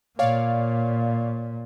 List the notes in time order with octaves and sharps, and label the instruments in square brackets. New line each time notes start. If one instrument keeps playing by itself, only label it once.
[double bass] A#2 [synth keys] C#5 D5 F5